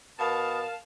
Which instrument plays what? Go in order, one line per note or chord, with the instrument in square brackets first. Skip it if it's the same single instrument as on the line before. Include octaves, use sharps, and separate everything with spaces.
[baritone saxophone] B2 [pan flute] A#4 [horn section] F5 A5 [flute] D#6